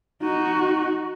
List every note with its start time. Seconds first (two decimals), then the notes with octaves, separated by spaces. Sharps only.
0.22 D#4 F#4